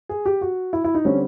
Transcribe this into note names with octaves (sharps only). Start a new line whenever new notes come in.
G#4
G4
F#4
E4
E4
D#4
D3 G3 C4 C#4